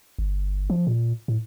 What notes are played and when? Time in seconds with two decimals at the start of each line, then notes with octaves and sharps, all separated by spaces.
0.19 G1
0.70 F3
0.87 A#2
1.28 A2